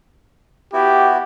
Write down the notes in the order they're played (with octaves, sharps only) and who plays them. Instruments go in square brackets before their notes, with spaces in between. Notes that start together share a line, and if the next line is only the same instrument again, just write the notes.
[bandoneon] B3 E4 F#4 [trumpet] G4